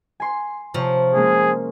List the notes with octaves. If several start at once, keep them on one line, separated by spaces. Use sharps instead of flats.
G#5 C6
C3 F3 C#5
G#3 A#3 C#4 G#4